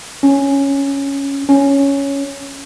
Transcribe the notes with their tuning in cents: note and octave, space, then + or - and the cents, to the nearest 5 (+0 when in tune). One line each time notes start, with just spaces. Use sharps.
C#4 +0
C#4 +5